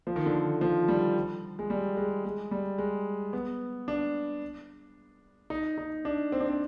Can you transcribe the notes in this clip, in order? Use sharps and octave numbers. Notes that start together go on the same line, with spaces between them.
F3
D#3
D3
D#3
F3
G3
G#3
G3
G#3
G#3
G3
G#3
B3
D4
D#4
D#4
D4
C4
D4
C4